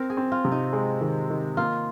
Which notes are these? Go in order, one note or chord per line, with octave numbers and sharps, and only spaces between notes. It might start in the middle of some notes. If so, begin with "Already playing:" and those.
Already playing: C4 A#4
G#4
C4
F4
C3
D#4
G#3
D#3
D#3
A#3 F4